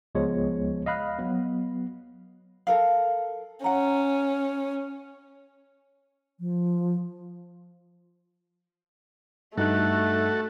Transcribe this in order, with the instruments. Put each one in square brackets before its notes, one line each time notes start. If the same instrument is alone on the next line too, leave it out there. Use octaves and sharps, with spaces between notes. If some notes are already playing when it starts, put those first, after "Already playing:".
[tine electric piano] C#2 F3 G#3 B3 C#5
D#5 F5 B5 F#6
F#3 B3
[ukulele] A4 A#4 F5
[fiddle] C#4 [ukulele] F#5 A#5
[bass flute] F3
[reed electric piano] G2 D#4 F#6 [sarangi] A3 [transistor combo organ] F#4 A4